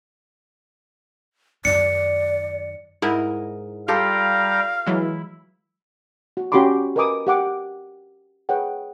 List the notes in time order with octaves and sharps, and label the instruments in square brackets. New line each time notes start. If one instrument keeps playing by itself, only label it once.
[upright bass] F#2 D#3 [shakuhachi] D5 [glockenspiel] C#7
[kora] G#2 A#4 D#5 [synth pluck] E4
[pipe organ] G3 G5 A#5 [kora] F4 G4 A4 [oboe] F5
[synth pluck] E3 F#3 G#3 [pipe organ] E4
[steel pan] F#4
C#4 F#4 G4 B5 C6 D6
A#4 B4 D#5 G#5 D6 D#6
G4 F#5 D6
G#4 B4 C#5 F#5 G5